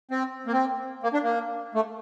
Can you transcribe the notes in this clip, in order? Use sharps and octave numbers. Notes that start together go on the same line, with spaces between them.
C4
A#3
C4
A#3
D4
A#3
A3